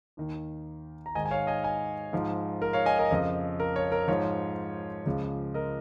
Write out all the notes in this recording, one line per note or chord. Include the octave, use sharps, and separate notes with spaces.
D#2 D#3
A#5
G#2 D#3 D#5 G#5
G#5
C#5 F5
D#5 G#5
D#5 G#5
G#2 F3
A#4
C#5 F5
D#5 G#5
A#4 D#5
F2 C#3 F3
A#4
C#5
A#4
G#2 F3 C#5
C#2 C#3 F3
A#4 D#5